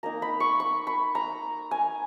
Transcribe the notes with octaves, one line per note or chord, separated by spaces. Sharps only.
A#3 D#4 A#5
B5
C#6
C#6
B5
A#5
G#5